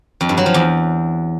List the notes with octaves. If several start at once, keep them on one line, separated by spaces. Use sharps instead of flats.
F2
G2
F#3
F3
E2